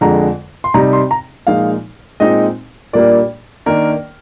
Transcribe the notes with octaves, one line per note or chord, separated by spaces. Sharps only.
F2 D3 G#3 A#5
C6
C3 G3 C4 D#4 A#5
C6
A#5
A#2 F3 G#3 D#4 F5
A#2 G#3 C4 D#4 D#5
A#2 G3 A#3 D4 D5
D#3 A#3 D4 A#4